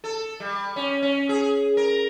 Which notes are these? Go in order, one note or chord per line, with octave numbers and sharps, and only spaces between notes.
A4
G3
C#4
C#4
G#4
A#4